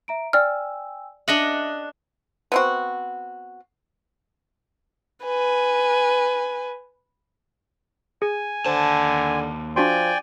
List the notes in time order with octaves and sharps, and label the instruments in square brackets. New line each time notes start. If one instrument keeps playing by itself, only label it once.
[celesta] E5 A#5 D7
[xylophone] D5 F6 [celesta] G5 G#5 E6
[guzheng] D4 D#5 F#5 [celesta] E5 F#7
[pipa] B3 C4 F#4
[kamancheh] B4 G#5
[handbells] G#4 [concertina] G#5
[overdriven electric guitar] D#2 A5 [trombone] D3 [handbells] C5
[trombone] F3 [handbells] D4 F#4 C6 [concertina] D5 G5 G#5